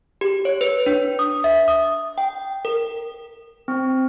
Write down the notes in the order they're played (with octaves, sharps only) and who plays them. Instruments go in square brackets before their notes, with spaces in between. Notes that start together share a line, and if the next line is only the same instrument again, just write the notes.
[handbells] G4
C#5
B4
D4
D#6
E5
D#6
G5
A#4
C4